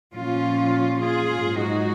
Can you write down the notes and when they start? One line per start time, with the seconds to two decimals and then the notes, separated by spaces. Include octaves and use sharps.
0.14 A#2 F3 C#4 F4
1.01 F4 G#4
1.31 G#2 F#3
1.59 D#4 F#4